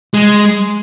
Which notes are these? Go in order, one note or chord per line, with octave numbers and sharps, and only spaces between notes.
G#3